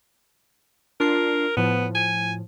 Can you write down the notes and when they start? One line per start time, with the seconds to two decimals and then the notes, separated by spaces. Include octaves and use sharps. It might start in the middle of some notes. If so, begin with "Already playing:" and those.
1.00 D4 F4 A#4 C7
1.57 A2 F3 B3
1.95 G#5